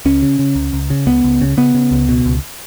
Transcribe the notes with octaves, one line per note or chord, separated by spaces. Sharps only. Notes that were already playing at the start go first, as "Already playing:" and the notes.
C#2 C#4
C#3
C#3
C#2
C#2
C#3
C#2 B3
C#2
C#3
C#3 B3
C#3
C#2
B2
C#2